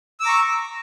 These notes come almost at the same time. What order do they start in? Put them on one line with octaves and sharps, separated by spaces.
E6 D6 A#5 C#6